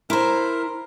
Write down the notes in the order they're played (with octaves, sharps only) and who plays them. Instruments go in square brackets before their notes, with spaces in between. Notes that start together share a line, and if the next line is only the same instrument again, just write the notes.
[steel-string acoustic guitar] E4 C5 [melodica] A#4 [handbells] A#5 C6 D7